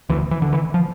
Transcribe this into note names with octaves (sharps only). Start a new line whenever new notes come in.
D2 E3
E3
D3
E3
F3